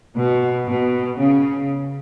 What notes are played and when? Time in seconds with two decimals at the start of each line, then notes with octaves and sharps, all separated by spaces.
0.16 B2
0.68 B2
1.20 C#3